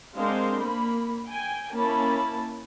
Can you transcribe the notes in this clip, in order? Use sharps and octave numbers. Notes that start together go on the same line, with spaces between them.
G#3 C4 D4 A#4 C5 F5
A#3 B5
G5 G#5
A#3 C#4 E4 A5 B5